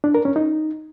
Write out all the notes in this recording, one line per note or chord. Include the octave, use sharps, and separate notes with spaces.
D4
A#4
C#4
D#4